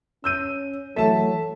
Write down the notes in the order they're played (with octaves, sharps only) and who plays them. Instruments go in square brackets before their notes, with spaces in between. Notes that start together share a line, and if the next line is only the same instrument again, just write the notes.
[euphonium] C#4 [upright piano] E6 G6 D#7
[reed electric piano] E3 A3 A4 [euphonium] F#3 [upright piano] E5 A5